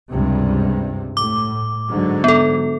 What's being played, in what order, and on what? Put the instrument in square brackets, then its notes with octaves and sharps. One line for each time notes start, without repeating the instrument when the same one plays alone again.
[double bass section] C#2 G2 C3
[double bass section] A2 [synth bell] D6
[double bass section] G#2 D3 F#3
[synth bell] B3 A4